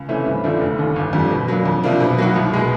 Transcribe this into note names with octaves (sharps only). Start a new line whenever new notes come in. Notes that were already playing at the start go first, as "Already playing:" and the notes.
Already playing: C#2
C3 E3 A3 C#4
G2
D3 F3 A3 D4
F1
D#2 D3
G1
F2 D3 G3
B2
F#3 A#3 D4
F2
C3 F3 A#3 D4
B2
F#3 A#3 D#4 F#4
C2
B2 G#3